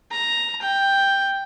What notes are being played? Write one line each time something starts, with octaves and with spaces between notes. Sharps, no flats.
A#5
G5